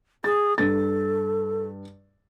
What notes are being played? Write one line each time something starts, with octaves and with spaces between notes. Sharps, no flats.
G#4 A6
G2 A4 A6